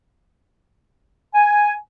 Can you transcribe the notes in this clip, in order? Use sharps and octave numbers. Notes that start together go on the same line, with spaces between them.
G#5